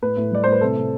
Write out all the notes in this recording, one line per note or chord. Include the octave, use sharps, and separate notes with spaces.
A2 B4
A2
G3 D5
A2 C5
B4
C3 A4
C3